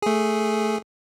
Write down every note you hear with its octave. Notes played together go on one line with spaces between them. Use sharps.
A3 G#4